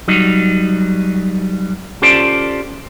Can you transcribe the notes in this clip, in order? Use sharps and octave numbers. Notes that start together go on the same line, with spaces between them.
F#3 G3 D#4
C#4 F4 G4 A4 C5 D5